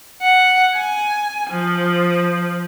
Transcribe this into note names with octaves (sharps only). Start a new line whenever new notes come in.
F#5
G#5
F3